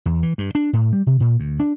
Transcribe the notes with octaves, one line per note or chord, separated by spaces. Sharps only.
E2
E3
G2
D4
A2
G3
C3
A#2
D2
D4